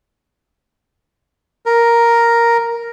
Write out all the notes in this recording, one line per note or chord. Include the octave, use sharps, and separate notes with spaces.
A#4